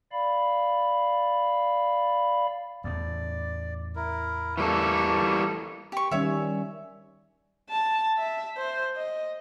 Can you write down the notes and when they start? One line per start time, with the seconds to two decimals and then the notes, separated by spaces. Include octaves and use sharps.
0.12 D5 F5 B5
2.84 E2 A2 D5
3.96 E4 A#4
4.58 E3 G3 A#3 A4 C#6
5.92 G4 C#6
6.11 D#3 G3 C#4 C#5 E5
7.70 A5
8.18 E5
8.57 C5
8.96 D#5